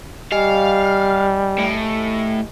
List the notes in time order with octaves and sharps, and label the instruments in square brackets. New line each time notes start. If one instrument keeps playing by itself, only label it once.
[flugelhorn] G3 [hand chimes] G4 D#5 G#5 [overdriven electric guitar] F5
[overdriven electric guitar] A2